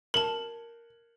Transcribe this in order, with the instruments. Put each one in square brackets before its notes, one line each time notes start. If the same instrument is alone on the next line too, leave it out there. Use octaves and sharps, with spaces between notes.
[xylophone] A#4 A5 [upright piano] F#7